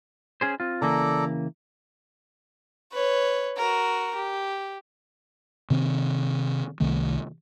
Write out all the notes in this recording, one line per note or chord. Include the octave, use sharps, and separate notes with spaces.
C#4 G#4 C5
C4 F4
C#3 E3 A#3 A4 D5 A#5
B4 C#5
F#4 A#4
G4
C3 D#3 C4
C2 C3 D#3 A3